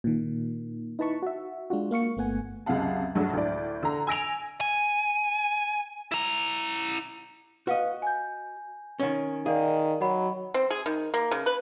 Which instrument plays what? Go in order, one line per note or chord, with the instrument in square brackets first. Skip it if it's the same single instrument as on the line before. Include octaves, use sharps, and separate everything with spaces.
[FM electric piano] A#2 D#3
D#4 E4 B4 A5 B5 C#6
F#4 E5
G#3 D4 F4 F#4
A#3 F5 C#6 C#7
G1 A3 B3 F#5 G#5
[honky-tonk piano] C#2 F#2 C3 F5 F#5 A5
G2 F#3 G#3 A3 D4 F#4
D2 A2 D5
D3 A#5
G#5 E6 A#6 D7 F7
[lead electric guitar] G#5
E4 A#5
[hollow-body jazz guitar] F#4 D#5 [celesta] B4 F5
[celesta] G#5 G6
[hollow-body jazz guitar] D#3 C#4
[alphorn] D#3 [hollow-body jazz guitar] G#4 [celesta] D5 F5
[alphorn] F#3 [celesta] D#5 F#5 B5
[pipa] C4
G#4
D#3
A#3
C#3
B4